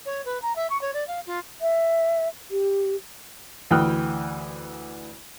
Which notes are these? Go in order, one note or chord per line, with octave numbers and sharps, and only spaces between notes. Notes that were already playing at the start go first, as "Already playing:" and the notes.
C#5
B4
A#5
E5
C#6
C#5
D5
F5
F4
E5
G4
D2 E3 G5 D#6 F6 F#6